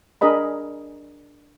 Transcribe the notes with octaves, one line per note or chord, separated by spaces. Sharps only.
D4 G#4 A#4 D#5 B5